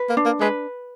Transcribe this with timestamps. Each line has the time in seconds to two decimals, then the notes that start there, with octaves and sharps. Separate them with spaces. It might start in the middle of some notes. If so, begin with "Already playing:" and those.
Already playing: B4
0.10 A#3
0.17 D4
0.26 A#3
0.41 G#3 B4